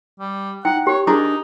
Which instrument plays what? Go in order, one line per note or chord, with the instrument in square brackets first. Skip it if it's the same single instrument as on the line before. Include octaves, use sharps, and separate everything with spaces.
[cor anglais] G3
[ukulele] D#4 [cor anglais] F#5 [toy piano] G5
[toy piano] G4 [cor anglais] C#5
[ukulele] D4 G#4 A#4 [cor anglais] D#4 [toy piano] D6